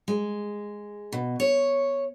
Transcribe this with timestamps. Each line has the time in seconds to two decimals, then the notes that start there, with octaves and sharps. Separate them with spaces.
0.08 G#3
1.13 B2
1.40 C#5